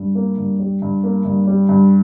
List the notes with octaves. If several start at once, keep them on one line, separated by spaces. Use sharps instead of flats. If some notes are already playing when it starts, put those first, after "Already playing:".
Already playing: G2
A#3
G2
G3
G2
A#3
G2
G3
G2